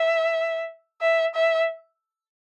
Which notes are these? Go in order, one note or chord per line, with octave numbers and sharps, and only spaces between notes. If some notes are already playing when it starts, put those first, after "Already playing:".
Already playing: E5
E5
E5